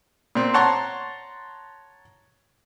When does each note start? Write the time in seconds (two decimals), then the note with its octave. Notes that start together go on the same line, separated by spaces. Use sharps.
0.35 A#2 C4
0.54 C#5 F#5 A5 A#5 C6 C#6